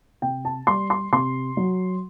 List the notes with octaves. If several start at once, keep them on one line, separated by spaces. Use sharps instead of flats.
C3 G5
A5
G3 C6
C6
C3 C6
F#3